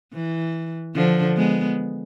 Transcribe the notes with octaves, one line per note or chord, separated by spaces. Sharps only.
E3
D3 F3
G#3 B3